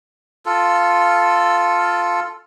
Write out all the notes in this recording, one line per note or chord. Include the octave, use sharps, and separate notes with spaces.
F4 A4